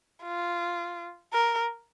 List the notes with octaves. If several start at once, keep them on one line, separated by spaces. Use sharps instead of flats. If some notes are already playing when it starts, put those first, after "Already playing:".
F4
A#4